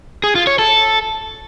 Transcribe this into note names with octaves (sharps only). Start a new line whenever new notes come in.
G#4
F4
C#5
A4